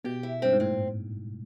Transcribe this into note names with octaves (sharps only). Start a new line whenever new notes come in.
B2 G4
E4
G2 C4
G#2
A2 C4